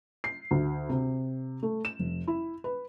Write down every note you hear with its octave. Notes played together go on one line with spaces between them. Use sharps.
C7
D2
C3
A3
E7
F1
E4
B4